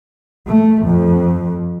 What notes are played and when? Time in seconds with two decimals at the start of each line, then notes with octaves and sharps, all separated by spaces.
0.48 A3
0.85 F2